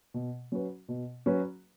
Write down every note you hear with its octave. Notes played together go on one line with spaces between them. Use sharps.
B2
F#3 C#4 F#4 B4
B2
F#3 C#4 F#4 B4